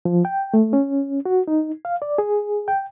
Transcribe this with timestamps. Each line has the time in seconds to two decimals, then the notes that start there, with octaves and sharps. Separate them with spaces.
0.05 F3
0.25 G5
0.54 A3
0.73 C#4
1.26 F#4
1.48 D#4
1.85 F5
2.02 D5
2.18 G#4
2.68 G5